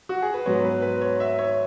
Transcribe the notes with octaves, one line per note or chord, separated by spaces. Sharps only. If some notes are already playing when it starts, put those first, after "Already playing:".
F#4
G#4
B4
G#2 F#3 B3 C#5
B4
B4
C#5
E5
C#5